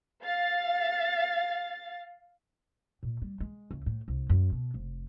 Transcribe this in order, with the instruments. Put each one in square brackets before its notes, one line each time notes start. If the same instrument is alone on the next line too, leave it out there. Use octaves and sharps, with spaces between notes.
[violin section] F5 A6
[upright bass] A#2
G3
G#3
C#2
A2
C2
F#2
B2
F1